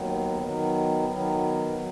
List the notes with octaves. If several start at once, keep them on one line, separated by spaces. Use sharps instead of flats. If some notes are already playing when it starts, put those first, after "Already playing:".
Already playing: D#2 D#3 F#3 B3
D#3 F#3 B3
D#3 F#3 B3
F#3 B3